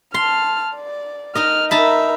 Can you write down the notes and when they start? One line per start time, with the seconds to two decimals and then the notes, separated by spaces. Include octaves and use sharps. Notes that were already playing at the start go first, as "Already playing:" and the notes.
0.14 A5 C6 F6
0.75 D5
1.35 D#4 A#4 D#5 F6
1.71 D#4 A#4 E5 A5 B5